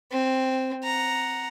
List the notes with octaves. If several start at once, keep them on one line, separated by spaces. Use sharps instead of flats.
C4
F#5 A#5